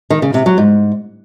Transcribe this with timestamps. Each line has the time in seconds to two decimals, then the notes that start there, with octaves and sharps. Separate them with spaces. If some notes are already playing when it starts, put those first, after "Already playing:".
0.10 D#3
0.22 C#3
0.34 C3
0.46 F#3
0.58 G#2